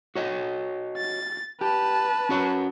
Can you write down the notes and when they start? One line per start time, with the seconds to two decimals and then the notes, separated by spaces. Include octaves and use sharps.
0.16 F#4 C#5 D#5
0.97 A6
1.61 G4 B4 A5
2.29 C#4 F#4 C#5